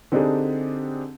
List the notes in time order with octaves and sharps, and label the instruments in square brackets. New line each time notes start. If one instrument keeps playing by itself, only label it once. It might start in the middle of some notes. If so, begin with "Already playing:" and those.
[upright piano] D3 C4 D4 D#4 G4 G#4